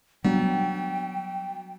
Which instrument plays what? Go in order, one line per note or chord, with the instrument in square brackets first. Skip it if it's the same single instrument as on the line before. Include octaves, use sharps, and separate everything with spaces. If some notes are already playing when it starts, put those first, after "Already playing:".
[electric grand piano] F#3 [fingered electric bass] G3 B3 D4 [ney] G5